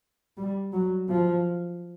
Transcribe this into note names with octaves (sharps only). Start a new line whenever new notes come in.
G3
F#3
F3